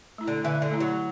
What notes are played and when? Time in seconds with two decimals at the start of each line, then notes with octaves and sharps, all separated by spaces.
0.18 A3 E4
0.27 D3
0.44 D3 E3
0.62 D3
0.71 A3 E4
0.80 F#3